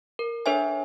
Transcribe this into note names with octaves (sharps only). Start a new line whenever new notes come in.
A#4
D4 A4 B4 C#5 E5 G#5